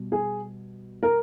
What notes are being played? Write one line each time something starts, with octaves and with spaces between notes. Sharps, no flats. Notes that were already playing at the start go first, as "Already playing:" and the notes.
Already playing: B2 G3
G#4
A#4